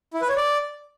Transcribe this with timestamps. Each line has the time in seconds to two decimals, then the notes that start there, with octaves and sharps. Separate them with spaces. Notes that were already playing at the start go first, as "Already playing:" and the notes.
0.14 E4
0.21 B4
0.29 C#5
0.37 D5